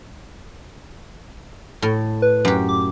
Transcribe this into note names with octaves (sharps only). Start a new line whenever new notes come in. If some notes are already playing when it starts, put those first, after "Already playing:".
A2
B4
F#2 G4
D6